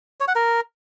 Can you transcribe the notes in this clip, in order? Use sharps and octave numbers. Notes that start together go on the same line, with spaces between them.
C#5
F#5
A#4